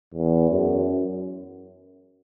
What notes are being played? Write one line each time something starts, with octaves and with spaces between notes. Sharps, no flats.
E2
F#2